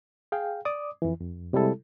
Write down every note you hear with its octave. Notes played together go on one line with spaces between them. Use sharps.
G#4 F5 G5
D5 D6 D#6
F2 E3
F2
C3 G3 G#3 E4 A4